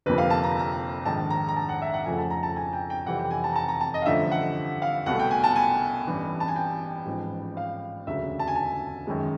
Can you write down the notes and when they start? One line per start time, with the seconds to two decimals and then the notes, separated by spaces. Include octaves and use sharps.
0.06 G1 F2 C3 F3 A#3 B4
0.18 F5
0.30 A5
0.44 A#5
0.59 A#5
1.05 A#1 G#2 D#3 A5
1.30 A#5
1.48 A#5
1.56 A5
1.69 F#5
1.82 E5
1.94 F#5
2.06 F2 C#3 F3 A3 G#5
2.18 A5
2.30 A#5
2.43 A5
2.56 G#5
2.73 G5
2.90 G5
3.06 F2 C3 E3 G3 F#5
3.19 G5
3.31 G#5
3.44 A5
3.52 A#5
3.56 A5
3.68 A#5
3.81 A5
3.94 D#5
4.02 F5
4.06 A1 G2 D3 F3 A3 E5
4.31 F#5
4.82 F5
5.06 C2 B2 F#3 A3 F#5
5.19 G5
5.31 G#5
5.44 A5
5.56 G#5
6.07 A1 G2 E3
6.40 A5
6.48 G#5
6.56 G5
7.06 A1 G#2 F3
7.57 F5
8.07 E1 D2 C#3 F#3 E5
8.39 A5
8.47 G#5
8.56 A5
9.07 F#2 D#3 G#3